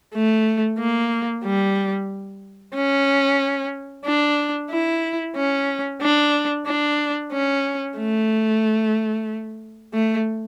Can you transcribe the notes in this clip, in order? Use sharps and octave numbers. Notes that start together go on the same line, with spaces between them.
A3
A#3
G3
C#4
D4
E4
C#4
D4
D4
C#4
A3
A3